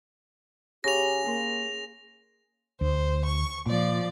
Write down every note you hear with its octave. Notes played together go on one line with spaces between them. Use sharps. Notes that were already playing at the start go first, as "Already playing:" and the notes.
C#3 G4 A#6 F7
A#3 C6
D2 C5
C#6
A#2 F3 D5